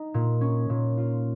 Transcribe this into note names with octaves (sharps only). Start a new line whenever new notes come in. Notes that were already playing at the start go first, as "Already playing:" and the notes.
Already playing: D#4
A#2
C#4
A#2
F4